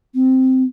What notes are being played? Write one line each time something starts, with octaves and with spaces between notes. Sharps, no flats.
C4